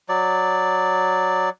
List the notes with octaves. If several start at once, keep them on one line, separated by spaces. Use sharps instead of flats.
F#3 D5